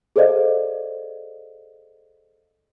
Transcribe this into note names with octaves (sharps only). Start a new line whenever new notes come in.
G#4 A4 C5 D5 D#5 F5